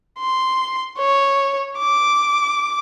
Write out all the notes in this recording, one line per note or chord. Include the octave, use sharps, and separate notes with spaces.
C6
C#5
D6